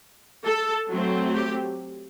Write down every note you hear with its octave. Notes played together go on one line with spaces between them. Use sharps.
A4
F#3 A3 C4
G4